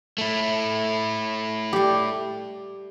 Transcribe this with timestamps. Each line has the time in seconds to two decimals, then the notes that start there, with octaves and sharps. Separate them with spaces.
0.18 A3 E4
1.73 G3 G4